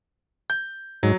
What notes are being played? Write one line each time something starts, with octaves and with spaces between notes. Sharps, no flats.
G6
G#2 F#3